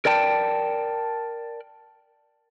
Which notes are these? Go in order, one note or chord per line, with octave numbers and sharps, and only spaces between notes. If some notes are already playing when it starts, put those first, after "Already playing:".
A#4 D5 G5 A5